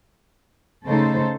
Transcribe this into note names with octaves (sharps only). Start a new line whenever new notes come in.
C#3 A3 D#4 A4 C5